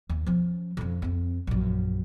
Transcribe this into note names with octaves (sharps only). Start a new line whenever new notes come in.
D#2
F3 C#4
F2 D3
F2 C4
A#1 F#2